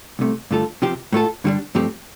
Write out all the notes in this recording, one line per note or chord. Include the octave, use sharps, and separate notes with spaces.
C2 C3 A3
G2 D3 A3 F4 A4
C3 F3 C4 G4
A2 A3 F4 A4
G2 D3 G3 D4
G2 F3 A3 C4 G4